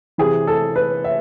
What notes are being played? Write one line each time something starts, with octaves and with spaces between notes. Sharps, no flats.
C3 E3 G#4
A4
B4
E5